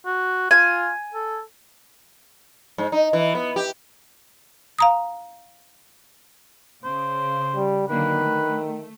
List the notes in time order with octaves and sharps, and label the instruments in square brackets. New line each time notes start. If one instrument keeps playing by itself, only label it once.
[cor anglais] F#4
[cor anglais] F4 [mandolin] G#5
[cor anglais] A4
[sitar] G#2
D#4
E3
B3
G4
[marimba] F5 A#5 D#6
[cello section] C#3 [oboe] C5
[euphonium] G3
[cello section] D3 F#3 A#3 [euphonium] D#3 [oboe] B4
[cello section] A3